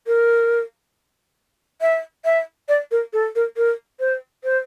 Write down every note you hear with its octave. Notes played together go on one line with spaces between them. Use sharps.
A#4
E5
E5
D5
A#4
A4
A#4
A#4
C5
C5